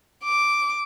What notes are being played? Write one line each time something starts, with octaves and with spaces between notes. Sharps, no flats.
D6